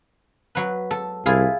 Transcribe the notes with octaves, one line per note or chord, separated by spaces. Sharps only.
F#3 B4
A4
C2 E4 F4 G#4